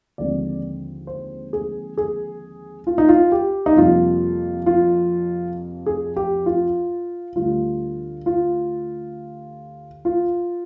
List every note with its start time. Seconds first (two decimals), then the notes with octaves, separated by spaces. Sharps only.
0.18 D#2 D3 F3 G#3 C4 D5
1.07 C5
1.53 G#4
1.97 G#4
2.87 F4
2.98 D#4
3.09 F4
3.32 G4
3.66 D#4
3.77 F2 C3 G3 A#3 F4
4.66 F4
5.86 G#4
6.16 G4
6.46 F4
7.36 D2 D3 G3 F4
8.26 F4
10.05 F4